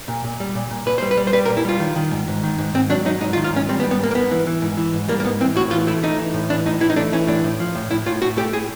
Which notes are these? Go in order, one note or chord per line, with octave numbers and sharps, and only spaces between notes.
A#2
A#2
G3
A#2
A#2
A#2 B4
G3 C5
B4
G3
C5
G3 B4
A#4
A#2
E4
G3 F4
D#3
D#3
G#2
G#2
D#3
G#2
G#2 C4
F#3 D4
F#3 D#4
G#2 D#4
F4
D#3
F4
G#2 C#4
G3 C4
B3
G3
B3
G#2 A#3
A#3
G#2 B3
E3
E3
G#2
E3
G#2
G3 A#3
A#3
G#2 B3
E3 C4
A2 F#4
E3 F4
A3 E4
A3 D#4
E3
A2
E3 D4
A2 D#4
E3 E4
D#4
A3 D4
E3 C#4
A2 D4
A2
F3
A2
A2 E4
A2 F4
A2 F#4
A3 G4
A2 G#4